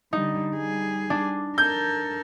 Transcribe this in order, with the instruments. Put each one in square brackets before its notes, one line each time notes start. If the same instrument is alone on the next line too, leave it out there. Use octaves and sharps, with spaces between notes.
[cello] D3 G3 [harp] D#4
[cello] G3 G#4
[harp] D4
[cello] A4 A#4 [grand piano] G6